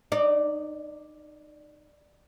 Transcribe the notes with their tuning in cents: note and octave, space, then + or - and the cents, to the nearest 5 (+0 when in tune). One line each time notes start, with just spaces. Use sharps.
D#4 -30 D5 +0